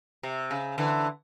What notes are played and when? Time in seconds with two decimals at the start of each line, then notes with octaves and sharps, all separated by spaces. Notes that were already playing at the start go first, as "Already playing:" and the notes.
0.23 C3
0.51 C#3
0.78 D3 E3